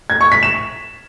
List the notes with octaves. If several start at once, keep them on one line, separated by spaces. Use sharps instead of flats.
G#6
C#6
B6
E7